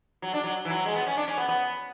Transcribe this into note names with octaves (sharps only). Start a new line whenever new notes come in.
F#3
D4
F#3
E3
F#3
G#3
B3
C#4
D4
C#4
B3
B3